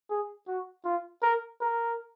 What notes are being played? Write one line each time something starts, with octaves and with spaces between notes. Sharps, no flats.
G#4
F#4
F4
A#4
A#4